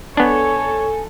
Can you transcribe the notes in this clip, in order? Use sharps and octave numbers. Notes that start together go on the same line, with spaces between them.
B3 D4 A4 C#5 G#5